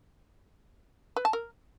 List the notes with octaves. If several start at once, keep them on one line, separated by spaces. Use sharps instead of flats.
B4
A5
A#4